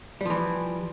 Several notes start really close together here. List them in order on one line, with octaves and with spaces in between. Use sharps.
G3 F3 E3